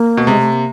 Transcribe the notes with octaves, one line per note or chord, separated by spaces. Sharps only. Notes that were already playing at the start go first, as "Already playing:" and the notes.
Already playing: A#3
B2
C3 G#3
A3
A#3